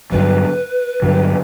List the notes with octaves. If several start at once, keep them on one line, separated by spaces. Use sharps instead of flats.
G2 D3 F#3 B4
G2 D3 F#3